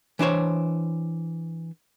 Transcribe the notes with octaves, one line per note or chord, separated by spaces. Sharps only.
E3 D4 C5 C#5